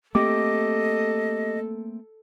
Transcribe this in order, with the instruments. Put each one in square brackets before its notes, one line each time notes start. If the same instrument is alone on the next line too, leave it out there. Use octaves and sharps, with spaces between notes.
[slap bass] A3 A#3 C4 [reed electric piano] G4 D6 [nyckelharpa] A4 [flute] D#5